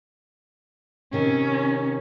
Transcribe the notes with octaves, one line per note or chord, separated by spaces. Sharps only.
C3 D#3 C#4